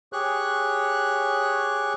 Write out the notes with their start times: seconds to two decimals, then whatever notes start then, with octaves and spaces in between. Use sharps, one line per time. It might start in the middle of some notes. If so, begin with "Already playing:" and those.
0.13 G4 G#4 C#5 C#6 F#6